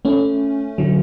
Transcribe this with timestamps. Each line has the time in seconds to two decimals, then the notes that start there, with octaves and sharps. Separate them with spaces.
0.05 A3 C#4
0.78 D3 F#3